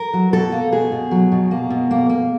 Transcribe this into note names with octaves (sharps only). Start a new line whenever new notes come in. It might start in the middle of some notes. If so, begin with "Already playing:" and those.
Already playing: A#4
F#3
B2 A4
A#3
B2 G#4
B2
F#3
B2
A#3
B2
A#3
A#3